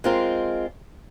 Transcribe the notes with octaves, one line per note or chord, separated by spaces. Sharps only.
G#3 C4 F4 A#4